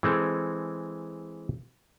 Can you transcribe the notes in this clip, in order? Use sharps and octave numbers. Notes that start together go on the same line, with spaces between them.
E3 G#3 C4 A4